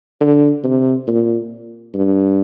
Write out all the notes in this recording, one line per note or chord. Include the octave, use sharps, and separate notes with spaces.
D3
C3
A#2
G2